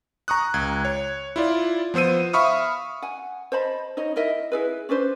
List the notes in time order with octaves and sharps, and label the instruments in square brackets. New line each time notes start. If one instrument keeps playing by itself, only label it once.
[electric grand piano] A#5 C#6 D#6 F#6
C#2 G#6
C#5
E4 F4 D5
F3 B3 C5 E6 D#7
E5 F5 B5 C#6 D#6 F6
[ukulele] F#5 G#5
C5 D#5 A5 B5
D#4 C#5 D#5
E4 A#4 D#5 E5
E4 G#4 B4
C#4 D4 B4 C5